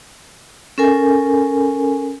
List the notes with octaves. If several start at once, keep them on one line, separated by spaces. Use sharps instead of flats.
C#4 A4 A#4 G#5